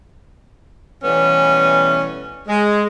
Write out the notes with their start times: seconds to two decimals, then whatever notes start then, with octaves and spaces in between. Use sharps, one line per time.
1.04 B2 E3 G3 A3 B3 C#4
2.48 G#3